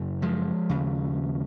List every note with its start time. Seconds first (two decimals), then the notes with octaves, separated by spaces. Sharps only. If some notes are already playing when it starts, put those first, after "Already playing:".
Already playing: F#2 C#3
0.22 F3 G#3
0.69 D#2 C#3